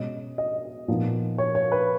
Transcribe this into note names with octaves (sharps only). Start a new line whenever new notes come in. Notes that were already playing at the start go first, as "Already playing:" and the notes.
Already playing: B2 G#3 C#4 D#5
D#5
A#2 F3 B3 D#4
C#5
C#5
B4